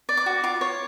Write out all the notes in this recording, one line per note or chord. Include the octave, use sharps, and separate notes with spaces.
D5
D6
F#4
F4 D6
C#5